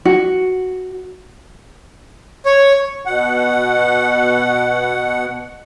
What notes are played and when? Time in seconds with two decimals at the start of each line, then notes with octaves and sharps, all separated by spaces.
0.05 F#4
2.46 C#5
3.05 B2 F#5